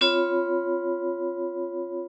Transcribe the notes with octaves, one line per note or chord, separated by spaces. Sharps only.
C4 F4 C#5 B5